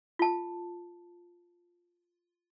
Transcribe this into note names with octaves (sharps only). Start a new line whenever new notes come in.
F4 A5